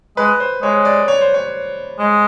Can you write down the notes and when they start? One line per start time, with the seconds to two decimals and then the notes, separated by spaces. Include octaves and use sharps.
0.17 G#3 B4
0.40 C5
0.62 G#3 C#5
0.85 D5
1.08 C#5
1.21 C5
1.34 C#5
1.99 G#3